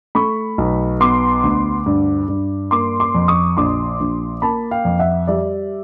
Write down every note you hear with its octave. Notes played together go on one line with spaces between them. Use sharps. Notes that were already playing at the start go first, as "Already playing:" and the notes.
A3 B5 C#6
B1
B3 C6 D6
D2
G2
G2
A#3 C6 D6
C6 D6
F2
C#6 D#6
A#1 C6 D6
A#1
A#3 A5 B5
F5 G5
F2
E5 F#5
G3 D5 E5